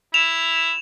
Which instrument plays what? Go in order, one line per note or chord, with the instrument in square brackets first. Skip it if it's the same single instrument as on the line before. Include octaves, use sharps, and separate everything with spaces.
[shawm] E4 [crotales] E7 F7